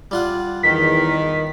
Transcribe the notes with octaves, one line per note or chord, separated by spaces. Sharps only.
G3 F4 F#5
E2 D#3 B6